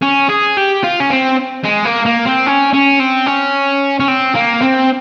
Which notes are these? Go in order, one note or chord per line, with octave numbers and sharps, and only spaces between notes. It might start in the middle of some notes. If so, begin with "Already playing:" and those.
C#4
G#4
G4
F4
C#4
C4
G#3
A#3
A#3
C4
C#4
C#4
C4
C#4
C#4
C4
A#3
C4